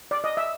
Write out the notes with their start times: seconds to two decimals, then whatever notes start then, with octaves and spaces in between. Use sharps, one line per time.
0.11 D5
0.24 D#5
0.37 E5